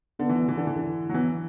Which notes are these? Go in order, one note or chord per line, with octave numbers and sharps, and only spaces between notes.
D3 B3
E3
D3
E3
D3
E3
D3
F#3
E3 B3